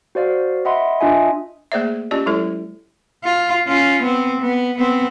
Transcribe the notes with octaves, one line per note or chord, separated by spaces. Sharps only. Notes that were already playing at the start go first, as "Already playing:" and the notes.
F#4 C5 D5 F5
D#5 E5 F#5 B5 C6
D4 F4 D#5 E5 G#5
A3 A#3 G#4 C5 D5 E5
C#4 F4 G4 D5 D#5
F#3 G#3 E4 A4 C5
F4
C#4 F4
B3 C4
B3
B3 C4